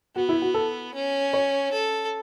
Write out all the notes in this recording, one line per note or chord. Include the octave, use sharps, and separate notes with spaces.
B3 F#4
E4
F#4
A4
C#4
C#5
A4